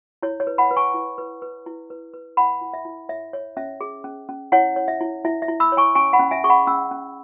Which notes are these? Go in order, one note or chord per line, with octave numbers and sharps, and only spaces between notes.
E4 C#5
C#5
B4
F#5 B5
B4
G#5 C#6
E4
B4
B4
E4
B4
B4
E4 F#5 B5
E4
E5
E4
C#5 E5
C#5
C#4 E5
G#4
C#4
C#4
E4 C#5 F#5
C#5
E5
E4
E4 E5
E5
E4
B5 E6
C#5
G#5 C#6
C#4 G#5 C#6
F#5 B5
C#4
E5 G#5
G#4 C#6
F#5 B5
C#4 B5 E6
C#4